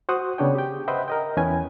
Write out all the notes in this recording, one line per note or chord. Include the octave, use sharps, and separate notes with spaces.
F#4 C5 F#5 D#6
C#3 B3 D4 C#5 G5
G4 G5
B4 C5 D#5 E5 F#5 G5
A#4 D#5 G5
E2 C#4 E4 B4 G#5